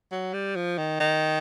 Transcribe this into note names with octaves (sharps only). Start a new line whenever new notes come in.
F#3
G3
F3
D#3
D#3